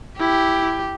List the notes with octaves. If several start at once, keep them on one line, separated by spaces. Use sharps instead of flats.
E4 G4